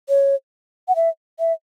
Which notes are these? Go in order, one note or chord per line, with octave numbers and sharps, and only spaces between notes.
C#5
F#5
E5
E5